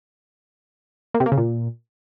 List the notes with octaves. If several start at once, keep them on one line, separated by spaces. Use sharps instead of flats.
A#3
C3
A#3
C#3
A#2